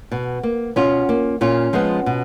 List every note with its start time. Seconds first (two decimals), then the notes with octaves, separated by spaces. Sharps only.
0.11 B2
0.43 A#3
0.76 B2 C#4 F4
1.09 A#3
1.41 A#2 C#4 F4
1.73 F3 G#3 B3
2.06 B2